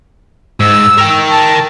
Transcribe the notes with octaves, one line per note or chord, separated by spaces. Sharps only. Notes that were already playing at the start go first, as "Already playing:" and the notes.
G#2 E6
A#4 G5
A5